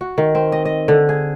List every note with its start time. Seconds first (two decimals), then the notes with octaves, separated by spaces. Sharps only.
0.01 F#4
0.18 D#3
0.35 C4
0.52 D#5
0.65 D#5
0.88 D3
1.09 G#4